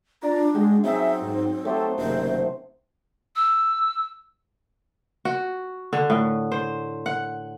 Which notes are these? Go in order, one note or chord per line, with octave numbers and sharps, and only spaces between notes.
D4 F4 D5 A#5
G#3 F#4 G5
F#3 C4 D#4 G#4 E5
G#2
A3 G4 A4 C5 C#5 F#5
F#1 C3 D#3 C5
E6
F#4
D3
A2
C5
F#5